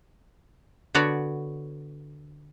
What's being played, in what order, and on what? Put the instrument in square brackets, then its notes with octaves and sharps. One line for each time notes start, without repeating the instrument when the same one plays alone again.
[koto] D3 B3 F#4 C#5 D5